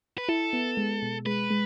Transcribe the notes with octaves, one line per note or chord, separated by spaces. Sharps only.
B4
E4 A4
B3
G#3
B2
G#3 B4
G#3